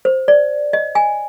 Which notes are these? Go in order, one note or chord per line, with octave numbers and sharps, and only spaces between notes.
C5
D5
D#5
G#5